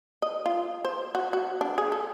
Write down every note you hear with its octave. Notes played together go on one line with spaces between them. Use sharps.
D#5
F4
C5
F#4
F#4
D4
G#4
A4